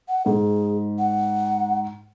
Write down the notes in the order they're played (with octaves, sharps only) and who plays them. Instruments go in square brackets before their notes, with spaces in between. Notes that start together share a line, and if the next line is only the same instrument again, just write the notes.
[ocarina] F#5
[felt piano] G#2 [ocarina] G#4
[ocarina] F#5